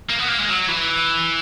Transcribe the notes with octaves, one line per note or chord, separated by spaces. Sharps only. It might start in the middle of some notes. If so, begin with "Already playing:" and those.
A#3
B3
A#3
G#3
F#3
E3